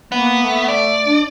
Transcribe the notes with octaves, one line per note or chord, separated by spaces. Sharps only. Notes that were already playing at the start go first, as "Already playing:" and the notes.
A#3 B3
A3
D5
D4